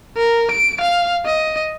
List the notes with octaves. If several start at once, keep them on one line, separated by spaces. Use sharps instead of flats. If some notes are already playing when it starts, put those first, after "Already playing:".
A#4
D7
F5
D#5